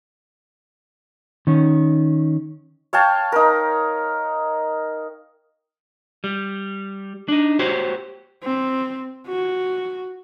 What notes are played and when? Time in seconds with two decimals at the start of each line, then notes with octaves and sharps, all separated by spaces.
1.47 D#3 C#4
2.93 C#5 F5 G5 A5
3.32 D#4 A#4
6.24 G3
7.28 D4 D#4
7.59 F#4 G4 C5 C#5
8.43 C4
9.27 F#4